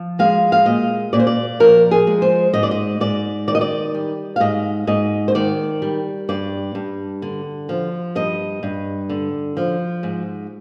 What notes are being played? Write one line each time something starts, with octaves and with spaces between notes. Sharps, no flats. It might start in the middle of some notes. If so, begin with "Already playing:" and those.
Already playing: F3
G#3 F5
F5
A#2 D#5
A#2 D5
C5
D5
F3 A#4
G#4
G#3
C5
G#2 D#5
D5
D#5
G#2 D5
D#3 D5
D#5
D5
G3
F5
G#2 D#5
G#2 D#5
C5
D#3 D5
G3
G2 D5
G2
D3
F3
G2 D#5
G2
D3
F3
G#2